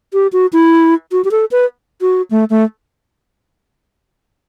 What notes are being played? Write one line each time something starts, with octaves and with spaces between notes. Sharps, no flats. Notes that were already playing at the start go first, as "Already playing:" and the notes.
G4
F#4
E4
F#4
G4
A4
B4
F#4
A3
A3